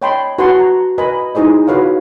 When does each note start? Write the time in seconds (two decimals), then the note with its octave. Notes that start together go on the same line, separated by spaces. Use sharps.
0.02 C#5 D#5 G5 A5 B5 C6
0.39 F#4 B4 F#5 A5 C6
0.59 A#5
0.98 A#4 B4 D#5 G#5 B5 C6
1.35 D#4 E4 G#4 C5 D#5
1.67 F4 F#4 B4 C#5 F5